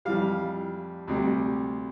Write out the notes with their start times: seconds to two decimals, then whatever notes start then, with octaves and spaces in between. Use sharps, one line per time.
0.05 F2 E3 G3 F5
1.08 D2 C3 G3